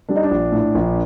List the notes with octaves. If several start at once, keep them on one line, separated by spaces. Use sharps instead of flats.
G3 D4
D#4
D4
A#1
A2
A#1